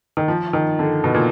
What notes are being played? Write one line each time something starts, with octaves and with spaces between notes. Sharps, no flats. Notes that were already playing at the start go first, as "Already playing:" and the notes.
D#3
F3
D#3
D3
B2
A#2